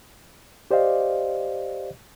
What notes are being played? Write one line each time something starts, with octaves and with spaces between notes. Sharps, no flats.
G4 C5 D5 D#5 F5